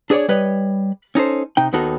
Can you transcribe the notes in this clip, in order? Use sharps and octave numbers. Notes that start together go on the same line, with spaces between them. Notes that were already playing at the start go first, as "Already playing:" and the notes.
D4 G#4 B4 C#5 D5
G3 B4 C#5 D#5
C#4 D#4 A4 C5
C3 D#4 G5
D#2 D#3 B3 D#4 F#4 A4